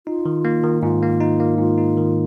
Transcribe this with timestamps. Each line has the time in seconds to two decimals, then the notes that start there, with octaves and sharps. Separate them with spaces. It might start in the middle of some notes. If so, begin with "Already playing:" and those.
0.07 D#4 F4
0.26 D#3
0.45 A#3
0.63 D#3
0.83 G#2 F4
1.02 A#3
1.20 D#4
1.40 A#3
1.58 G#2 F4
1.78 D#4
1.97 D#3